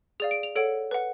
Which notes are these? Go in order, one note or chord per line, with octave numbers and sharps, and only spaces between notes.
G#4 D5 F5 F7
D7
F7
A4 C#5 F#5 D7
B4 F#5